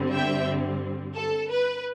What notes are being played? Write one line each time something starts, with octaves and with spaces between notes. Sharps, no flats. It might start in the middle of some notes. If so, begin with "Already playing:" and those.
Already playing: G2 D3 G3 C4
E5 G5
A4
B4